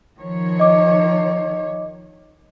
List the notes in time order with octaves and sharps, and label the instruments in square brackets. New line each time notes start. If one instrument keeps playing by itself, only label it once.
[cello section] D#3 F3 C#5
[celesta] D#5 D6